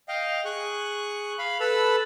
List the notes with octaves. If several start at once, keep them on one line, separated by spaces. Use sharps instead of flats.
D#5 F5 G5
G#4 C#6 F#6
F5 B5
A4 B4 A5 B5 E6